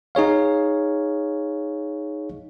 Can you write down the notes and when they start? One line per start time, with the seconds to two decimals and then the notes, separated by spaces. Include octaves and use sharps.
0.15 D#4 G#4 C#5 F5